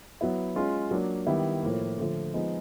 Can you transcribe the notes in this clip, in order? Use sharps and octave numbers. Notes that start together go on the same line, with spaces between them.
F#3 B3 E4
G#3 C#4 F4
F#3 A#3 D4
D#3 G3 B3 E4
A2 F3 A#3
D3 F3 A3
F3 G#3 B3 D#4